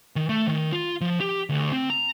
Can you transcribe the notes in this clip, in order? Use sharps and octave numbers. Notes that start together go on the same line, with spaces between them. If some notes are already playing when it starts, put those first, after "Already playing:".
D#3
A3
D#3
F4
F3
G4
D2
C4
A#5